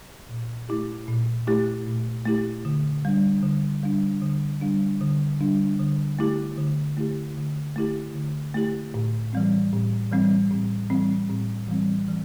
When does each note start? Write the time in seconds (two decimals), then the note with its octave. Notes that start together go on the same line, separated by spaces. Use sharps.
0.29 A#2
0.69 A3 E4 G4
1.08 A#2
1.47 A3 E4 G4
1.87 A#2
2.26 A3 E4 G4
2.65 D3
3.05 G3 D4
3.43 D3
3.83 G3 D4
4.22 D3
4.61 G3 D4
5.01 D3
5.41 G3 D4
5.79 D3
6.19 A3 E4 G4
6.58 D3
6.97 A3 E4 G4
7.37 D3
7.76 A3 E4 G4
8.15 D3
8.54 A3 E4 G4
8.94 A2
9.33 E3 G3 C4
9.73 A2
10.11 E3 G3 C4
10.50 A2
10.90 E3 G3 C4
11.29 A2
11.68 E3 G3 C4
12.08 E3